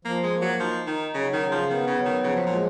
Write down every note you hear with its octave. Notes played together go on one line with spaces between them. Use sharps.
F3 A#3
G#3
A#3
F#3
F3 D#4
D#3 D#4
C#3 F#3
D#3
C#3
F3
D#3 B3
C#3
F#3
D#3
C#3 F3
B2
A#2
G#3